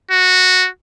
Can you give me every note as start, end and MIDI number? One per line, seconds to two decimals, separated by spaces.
0.11 0.68 66